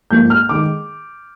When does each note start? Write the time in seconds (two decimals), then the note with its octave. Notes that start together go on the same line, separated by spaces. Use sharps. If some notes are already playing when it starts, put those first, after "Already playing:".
0.11 G#2 F3 A#3 G6
0.30 F6
0.49 D#3 G#3 D6